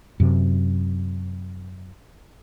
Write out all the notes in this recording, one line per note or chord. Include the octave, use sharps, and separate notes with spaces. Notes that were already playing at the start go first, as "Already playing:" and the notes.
F#2 C3